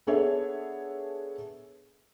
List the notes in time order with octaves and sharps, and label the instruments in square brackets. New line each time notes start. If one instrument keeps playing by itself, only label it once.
[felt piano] B3 D4 G#4 A4 C#5 E5